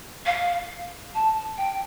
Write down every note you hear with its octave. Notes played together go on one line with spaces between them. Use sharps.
F5
A5
G5